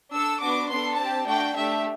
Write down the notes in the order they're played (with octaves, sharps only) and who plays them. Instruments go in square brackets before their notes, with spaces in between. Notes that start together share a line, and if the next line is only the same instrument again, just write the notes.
[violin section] D4 A4 E6
B3 D4 F#4 D6
B3 D4 A4 C6
C4 G4 A5
A3 D4 F#4 G5
A3 D4 G4 E5